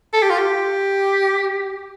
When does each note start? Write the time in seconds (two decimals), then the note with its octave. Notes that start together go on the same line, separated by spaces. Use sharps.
0.13 A4
0.22 G4
0.30 F4
0.38 G4